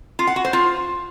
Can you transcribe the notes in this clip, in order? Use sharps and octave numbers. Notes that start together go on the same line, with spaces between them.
F4
F#5
F#4
C5
F4